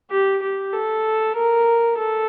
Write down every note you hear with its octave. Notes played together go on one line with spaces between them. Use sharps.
G4
G4
A4
A#4
A4